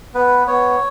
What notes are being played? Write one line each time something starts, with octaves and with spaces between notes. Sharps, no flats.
B3 B4
B3 C#5